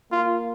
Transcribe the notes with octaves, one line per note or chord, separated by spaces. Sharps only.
A#3 F4